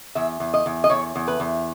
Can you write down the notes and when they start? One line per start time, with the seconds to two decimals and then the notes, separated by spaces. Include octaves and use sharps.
0.15 E2 E5
0.40 E2
0.54 D#5
0.66 E2
0.84 D#5
0.90 E2 C#5
1.16 E2
1.28 B4
1.40 E2